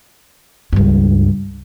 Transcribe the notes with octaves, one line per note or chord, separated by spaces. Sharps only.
C#2 G2